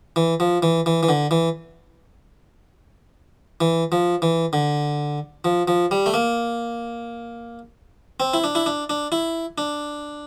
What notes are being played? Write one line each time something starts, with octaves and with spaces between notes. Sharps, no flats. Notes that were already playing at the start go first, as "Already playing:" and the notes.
E3
F3
E3
E3
E3
D3
E3
E3
F3
E3
D3
F3
F3
G3
A3
A#3
C4
E4
D4
E4
D4
D4
E4
D4